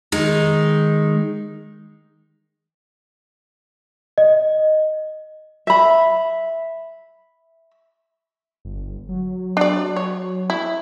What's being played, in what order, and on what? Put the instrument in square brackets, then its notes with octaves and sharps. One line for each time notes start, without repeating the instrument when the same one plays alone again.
[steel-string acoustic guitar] D#3 G#3 D#4
[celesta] D#5
[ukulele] E5 B5
[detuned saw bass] G1
F#3
[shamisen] D4 D5
C#5
E4